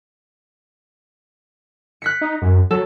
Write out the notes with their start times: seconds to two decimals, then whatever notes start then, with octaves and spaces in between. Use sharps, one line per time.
2.02 F#6 B6 C#7
2.21 D#4
2.42 F#2
2.71 F#3 A4